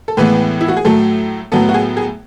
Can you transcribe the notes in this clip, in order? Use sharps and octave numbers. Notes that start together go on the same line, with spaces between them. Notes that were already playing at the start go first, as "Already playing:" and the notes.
A4
A2 E3 G#3 B3 B4
E4
F#4
G#4
A2 F#3 A3 A4
A2 F#3 B3 A4
F#4
G#4
G#4